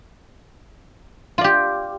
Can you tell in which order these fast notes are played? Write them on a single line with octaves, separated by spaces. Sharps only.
F4 D5 G4